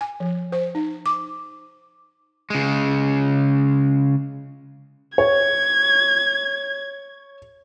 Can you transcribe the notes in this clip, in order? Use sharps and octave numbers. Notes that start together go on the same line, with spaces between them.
G#5
F3
C5
D#4
D6
C#3 G#3
C#5 G#6